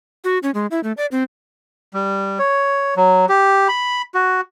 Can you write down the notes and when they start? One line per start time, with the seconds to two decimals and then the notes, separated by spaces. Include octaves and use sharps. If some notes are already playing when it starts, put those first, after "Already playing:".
0.24 F#4
0.43 C#4
0.54 G#3
0.71 E4
0.84 A3
0.97 D5
1.12 C4
1.94 G3
2.39 C#5
2.97 F#3
3.29 G4
3.68 B5
4.15 F#4